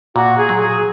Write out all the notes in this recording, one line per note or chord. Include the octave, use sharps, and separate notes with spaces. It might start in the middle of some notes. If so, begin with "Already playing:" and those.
A#2 F#4
G#4
F#3
G#4